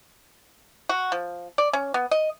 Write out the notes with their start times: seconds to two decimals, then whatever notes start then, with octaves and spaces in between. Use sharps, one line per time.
0.89 F#4
1.12 F3
1.58 D5
1.73 C#4
1.94 B3
2.11 D#5